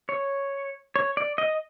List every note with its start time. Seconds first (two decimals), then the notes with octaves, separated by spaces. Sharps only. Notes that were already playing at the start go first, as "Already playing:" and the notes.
0.09 C#5
0.96 C#5
1.17 D5
1.38 D#5